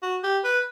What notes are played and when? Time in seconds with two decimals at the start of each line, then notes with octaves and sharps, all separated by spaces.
0.03 F#4
0.23 G4
0.44 B4